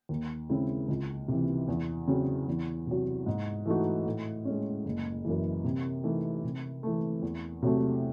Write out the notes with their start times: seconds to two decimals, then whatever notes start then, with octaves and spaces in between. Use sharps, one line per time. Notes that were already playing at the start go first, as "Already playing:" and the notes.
0.09 D#2
0.49 C#3 G#3 C4 E4
0.88 C#2
1.28 C3 E3
1.68 E2
2.08 C#3 F#3 C4
2.48 E2
2.87 C3 F#3
3.26 G#2
3.66 E3 A3 D#4 F#4
4.06 A2
4.45 G#3 C#4
4.85 F#1
5.25 F#2 E3
5.64 C3
6.03 E3 A3 D#4
6.44 C3
6.83 E3 A3
7.22 E2
7.63 C3 F#3 A3